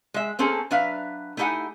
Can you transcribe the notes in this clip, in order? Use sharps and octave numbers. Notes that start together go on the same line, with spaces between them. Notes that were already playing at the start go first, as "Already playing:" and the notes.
G#3 E5
A#3 C4 C#4 G#4 A4
F#3 D4 B4 E5 F5
A3 D#4 E4 G4 F#5 G#5